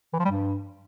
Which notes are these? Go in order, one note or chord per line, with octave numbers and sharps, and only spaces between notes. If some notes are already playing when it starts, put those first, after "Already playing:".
E3
F3
G3
G2